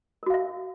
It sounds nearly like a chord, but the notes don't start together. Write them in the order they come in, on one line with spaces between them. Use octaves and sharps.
A#4 F#4 F5 E5